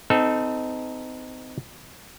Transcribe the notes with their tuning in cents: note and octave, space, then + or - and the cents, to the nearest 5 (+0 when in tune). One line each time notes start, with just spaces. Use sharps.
C4 -35 D#4 +0 A4 -10